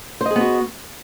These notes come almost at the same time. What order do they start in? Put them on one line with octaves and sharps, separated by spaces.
C5 D#5 G#4 B3 F#4